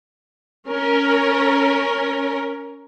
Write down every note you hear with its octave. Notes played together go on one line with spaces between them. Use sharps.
C#4 A#4